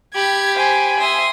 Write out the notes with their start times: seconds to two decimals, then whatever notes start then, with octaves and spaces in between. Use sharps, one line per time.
0.15 G4 B5 G#6
0.57 C5 G#5
0.99 E5 C6 D#6